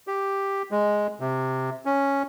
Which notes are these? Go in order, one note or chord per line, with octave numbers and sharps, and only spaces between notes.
G4
G#3
C3
C#4